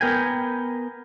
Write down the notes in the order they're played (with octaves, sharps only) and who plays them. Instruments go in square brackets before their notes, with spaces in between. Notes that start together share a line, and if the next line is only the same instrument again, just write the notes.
[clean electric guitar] B3 A#4 G5 G#5